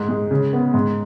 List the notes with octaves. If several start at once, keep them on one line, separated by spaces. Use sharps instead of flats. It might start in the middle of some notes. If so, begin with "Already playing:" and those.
Already playing: G#2
G#3
C#3
B3
G#2